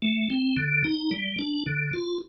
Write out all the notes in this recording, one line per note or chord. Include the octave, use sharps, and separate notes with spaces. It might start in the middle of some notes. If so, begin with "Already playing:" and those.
A3
C4
D3
D#4
G3
D4
D3
F4